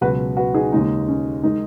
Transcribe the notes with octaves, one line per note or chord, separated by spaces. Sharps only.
C#2 B2 F#3 F#4 B4
F#4 B4
D#4 G#4
D#2 C#3 G#3 D#4
C#4
D#3 G#3 D#4